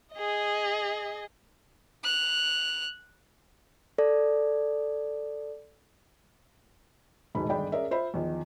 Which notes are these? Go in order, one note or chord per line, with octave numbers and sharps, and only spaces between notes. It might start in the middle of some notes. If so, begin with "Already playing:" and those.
G#4 D#5
F#6 F7
A4 D5
E1 D2 G#2 D#4 B5
G1 D#3 D4 G#4 G5 B5
C#4 G#4 A#4 D5 E5
F4 C5 E5 B5
E2 D#3 F3